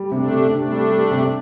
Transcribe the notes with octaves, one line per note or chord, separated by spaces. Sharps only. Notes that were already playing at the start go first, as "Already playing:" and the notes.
Already playing: G3
C3 A3 D4
C3
C3 A3 D4
G3
G3
C3